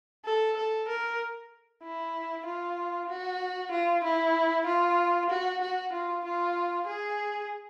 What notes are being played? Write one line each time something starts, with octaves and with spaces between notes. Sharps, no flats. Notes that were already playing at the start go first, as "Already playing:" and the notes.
A4
A4
A#4
E4
F4
F#4
F4
E4
F4
F#4
F#4
F4
F4
G#4